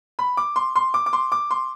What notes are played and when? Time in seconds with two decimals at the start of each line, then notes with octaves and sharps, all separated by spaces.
0.19 B5
0.37 D6
0.56 C6
0.75 C6
0.94 D6
1.06 D6
1.13 C6
1.32 D6
1.51 C6